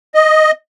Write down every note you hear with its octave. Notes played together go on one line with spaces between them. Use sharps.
D#5